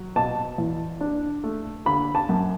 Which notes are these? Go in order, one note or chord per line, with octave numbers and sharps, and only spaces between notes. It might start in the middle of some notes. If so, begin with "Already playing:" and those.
Already playing: F#3
B2 A5
E2
D4
A3
D3 B5
A5
F#2